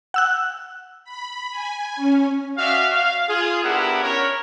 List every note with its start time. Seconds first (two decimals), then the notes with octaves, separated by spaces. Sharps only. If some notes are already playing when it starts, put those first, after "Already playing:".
0.14 F#5 E6 F#6
1.04 B5
1.51 G#5
1.96 C#4
2.58 C#4 F#4 D5 E5 F5
2.93 F5
3.29 F4 G#4
3.64 B3 D4 E4 G4 A#4 F#5
4.03 C#4 A#4 C#5